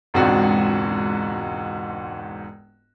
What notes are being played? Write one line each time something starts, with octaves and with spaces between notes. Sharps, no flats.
E1 C#2 G#2 C4 D4 F#4